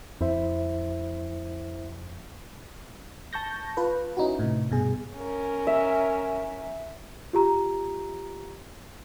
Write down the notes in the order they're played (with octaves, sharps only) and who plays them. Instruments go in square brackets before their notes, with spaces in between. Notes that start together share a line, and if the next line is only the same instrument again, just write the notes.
[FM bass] F2 [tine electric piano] E4 C5 E5
[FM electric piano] A5 C#6 G6 A#6
F4 B4
C#4 D#4 E4 F#4
A2 C3
G2 B2 G#4
[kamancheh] C#4 A#4
[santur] E5
[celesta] F4 G4 A#5